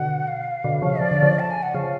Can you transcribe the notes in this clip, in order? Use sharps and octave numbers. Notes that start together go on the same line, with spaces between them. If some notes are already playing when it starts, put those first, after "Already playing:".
Already playing: B2 D3 F#5
F5
B2 D3
C#3 F3
F3 D5
D3
C#3 F3
A5
G#5
F#5
C#3 F3 F5